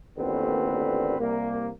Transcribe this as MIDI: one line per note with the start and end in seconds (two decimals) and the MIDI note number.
0.18 1.17 33
0.18 1.17 39
0.18 1.17 46
0.18 1.17 50
0.18 1.17 60
0.18 1.17 71
1.19 1.69 36
1.19 1.69 58